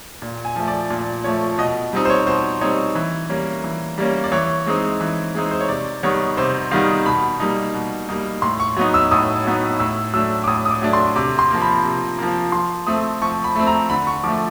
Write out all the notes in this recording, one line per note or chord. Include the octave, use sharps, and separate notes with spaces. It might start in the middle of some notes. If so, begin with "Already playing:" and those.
A#2
G#5
F3 A3
D5
A#2
F3 A3 C#5
B2 D#5
G3 C4 D#4
C5
C#5
B2 C5
G3 C4 D#4 C#5
E3
G3 A#3 C#4
E3
G3 A#3 C#4
D5
E3 C#5
G#3 C4 D#4
E3
G#3 C4 D#4
C5
C#5
C3 D5
D#3 G3 B3 D#4 C#5
C3 C5
D#3 G3 B3 D#4 F5
B2 B5
G3 A#3 D#4
B2
G3 A#3 D#4
A2 C6
C#6
F#3 B3 D#4
E6
A2 D#6
F#3 B3 D#4
A2 E6
F#3 A3 D4 E6
D6
A2 D#6
D#6
D6
F#3 A3 D4
C6
C3 D6
C6
F3 A#3
B5
C3
F3 A#3
F3 C6
A3 C4 D#6
F3 C#6
B5
A3 C4
A#5
D3 B5
C#6
F3 A3 D6